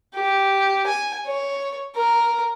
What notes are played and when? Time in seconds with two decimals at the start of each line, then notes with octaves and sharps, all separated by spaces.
0.15 G4
0.87 G#5
1.27 C#5
1.96 A#4